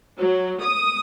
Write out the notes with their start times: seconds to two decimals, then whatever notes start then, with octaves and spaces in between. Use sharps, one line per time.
0.19 F#3
0.62 D#6